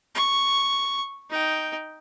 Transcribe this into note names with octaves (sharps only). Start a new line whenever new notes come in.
C#6
D#4 G5